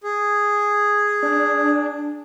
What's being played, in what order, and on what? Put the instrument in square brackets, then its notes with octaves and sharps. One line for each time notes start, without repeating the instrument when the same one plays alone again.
[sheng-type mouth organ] G#4
[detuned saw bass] D4